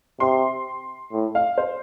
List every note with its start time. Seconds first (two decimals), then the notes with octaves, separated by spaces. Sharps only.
0.20 C3 C6
1.13 A2
1.35 F5
1.58 C5